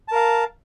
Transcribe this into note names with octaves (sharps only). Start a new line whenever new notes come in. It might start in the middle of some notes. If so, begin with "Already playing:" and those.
A#4 F5 A5